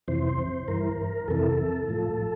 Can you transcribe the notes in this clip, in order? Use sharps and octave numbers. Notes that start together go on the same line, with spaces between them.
F2 C3 E3 C5
G2 E3 A#4
F2 C3 E3 A4
A2 F3